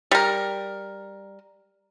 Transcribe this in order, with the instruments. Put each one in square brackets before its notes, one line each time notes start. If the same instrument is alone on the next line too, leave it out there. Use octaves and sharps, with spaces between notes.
[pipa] G3 A#4